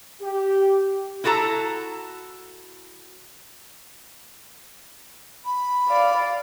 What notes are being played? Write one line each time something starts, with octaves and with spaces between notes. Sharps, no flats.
G4
E4 F#4 A4 A5 A#5
B5
D5 F5